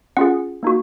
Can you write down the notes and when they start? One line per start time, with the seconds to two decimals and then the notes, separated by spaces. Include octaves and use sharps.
0.17 C#4 F4 G#4 F#5
0.63 A#3 D#4 F#4